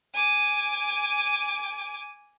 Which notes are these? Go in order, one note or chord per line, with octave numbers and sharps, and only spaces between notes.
G#5 D6